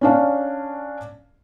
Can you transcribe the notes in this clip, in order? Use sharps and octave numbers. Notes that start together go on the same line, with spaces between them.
C#4 D4 F5